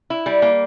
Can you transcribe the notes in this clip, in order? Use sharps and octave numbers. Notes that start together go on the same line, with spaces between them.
E4
G3
A#3